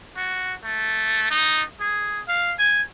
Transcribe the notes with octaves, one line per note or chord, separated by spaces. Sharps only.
F#4
A3
D#4
G#4
F5
G#5